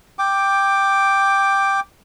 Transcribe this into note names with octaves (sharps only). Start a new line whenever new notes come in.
G5 D6